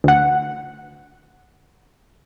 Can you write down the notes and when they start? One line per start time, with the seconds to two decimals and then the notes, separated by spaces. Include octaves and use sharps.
0.04 D2 F#5